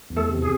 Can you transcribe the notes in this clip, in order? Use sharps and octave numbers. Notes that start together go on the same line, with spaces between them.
E2
A3 A4
C3
G#4